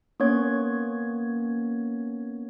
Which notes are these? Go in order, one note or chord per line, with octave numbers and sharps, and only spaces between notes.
A#3 B3 C#4 C#5 G#6